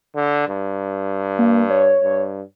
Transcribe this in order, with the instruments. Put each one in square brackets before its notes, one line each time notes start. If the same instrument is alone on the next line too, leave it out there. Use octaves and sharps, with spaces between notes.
[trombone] D3
G2
[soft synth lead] A#3
C#5
[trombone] G2